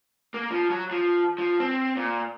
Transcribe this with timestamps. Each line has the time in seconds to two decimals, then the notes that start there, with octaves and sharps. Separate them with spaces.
0.34 A#3
0.51 F3
0.70 F#3
0.91 F3
1.38 F3
1.60 C4
1.97 A#2